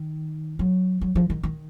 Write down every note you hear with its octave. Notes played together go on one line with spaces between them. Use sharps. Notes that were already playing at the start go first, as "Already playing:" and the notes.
Already playing: D#3
F#3
F#3
F3
D#3
D#3